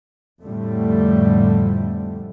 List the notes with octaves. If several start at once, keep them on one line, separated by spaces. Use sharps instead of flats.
F2 A2 D3 G3 A3